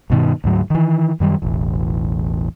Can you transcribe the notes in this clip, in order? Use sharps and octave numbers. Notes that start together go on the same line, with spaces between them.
G2 B2 D#3
D2 G#2 F#3
D#3 E3
F#2 D#3 G3
E1 A1